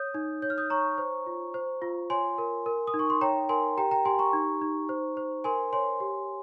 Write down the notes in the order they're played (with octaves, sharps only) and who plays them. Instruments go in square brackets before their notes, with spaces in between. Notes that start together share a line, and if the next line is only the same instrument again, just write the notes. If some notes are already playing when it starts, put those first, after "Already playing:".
Already playing: [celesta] C#5 D#6 G6
D#4
C#5 G6
F6
D#6 G6
C#5 A#5 C#6
C5
F4
C5
F4
C#5 G#5 C6
A#4
A#4
D#6
D#4
C#6
C6
C#5 G5 A#5
A#4 G#5 C6
G4 G5 A#5
G5 A#5
G4 G#5 C6
A#5 C#6
D#4
D#4
C5
C5
A#4 G#5 C6
C#5 G#5 C6
G4